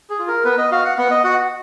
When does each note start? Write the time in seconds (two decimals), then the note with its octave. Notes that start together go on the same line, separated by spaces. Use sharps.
0.10 G#4
0.19 F4
0.28 A#4
0.45 B3 B4
0.58 D#5
0.71 F#4 F5
0.85 F#5
0.98 B3 F#5
1.11 D#5
1.24 F#4 F#5